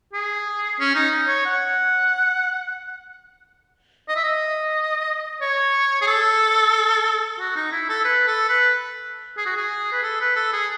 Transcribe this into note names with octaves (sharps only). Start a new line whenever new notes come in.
G#4
C#4
D#4
C#5
F#5
D#5
E5
D#5
C#5
G#4
A4
F#4
D#4
E4
A4
B4
A4
B4
G#4
F#4
G#4
B4
A4
B4
A4
G#4